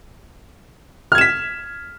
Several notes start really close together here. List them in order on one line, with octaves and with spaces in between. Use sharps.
F6 G#6 E7 B6